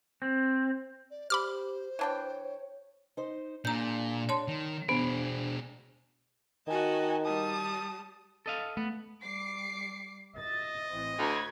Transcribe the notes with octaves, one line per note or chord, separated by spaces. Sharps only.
C4
D5
G4 C5 B5 D6 F6
E3 D4 C#5 G5
D#4 C5
A#2 D4 G#4 A#5 G6
C#5 A5 C6
D#3
B2 B3 D4 G#4 C5
D#3 F#4 D#5 G#5 A5
G3 A5 D#6
A4 D#5 F5
A3 B3
G3 D6 C7
D#5 E5 A6
A1 E3 C4
D2 C#5 B5 G#6